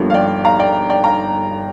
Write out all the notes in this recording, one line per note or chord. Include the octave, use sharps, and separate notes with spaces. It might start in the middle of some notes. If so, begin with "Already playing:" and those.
Already playing: G1 G2 F3 A#3
F5
D5 G5
F5 A#5
D5 G5
D5 G5
F5 A#5